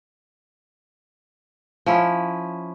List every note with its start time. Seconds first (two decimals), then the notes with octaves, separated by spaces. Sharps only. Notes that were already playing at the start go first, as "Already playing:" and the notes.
1.86 F3 C#4 E4